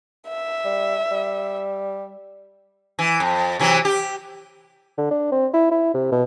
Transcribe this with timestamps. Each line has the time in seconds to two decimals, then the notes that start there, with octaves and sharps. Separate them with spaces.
0.28 E5
0.65 G3
1.11 G3
2.99 E3
3.20 F2
3.59 C3 E3 F#3
3.85 G4
4.98 D3
5.11 D4
5.32 C4
5.54 E4
5.71 E4
5.95 C3
6.12 B2